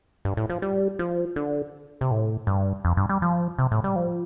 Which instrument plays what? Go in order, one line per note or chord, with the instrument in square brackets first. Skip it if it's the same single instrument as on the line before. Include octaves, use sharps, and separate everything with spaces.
[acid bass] G2
A2
F3
G3
F3
D3
C3
A2
G2
F2
G2
G3
F3
C3
A2
G3
F3